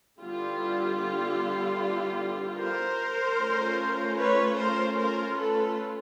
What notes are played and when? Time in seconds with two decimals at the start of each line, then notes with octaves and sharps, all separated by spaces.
0.20 D3 G3 B3 E4 F4 G4
2.58 A#4 C5
3.38 A3 C#4 F4
4.18 B4 C#5
4.58 A#4 C5
4.97 A#4 C5
5.37 A4 B4